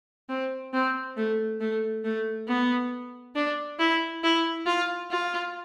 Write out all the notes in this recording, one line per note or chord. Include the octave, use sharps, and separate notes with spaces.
C4
C4
A3
A3
A3
B3
D4
E4
E4
F4
F4